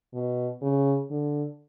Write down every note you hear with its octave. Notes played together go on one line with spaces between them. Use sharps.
B2
C#3
D3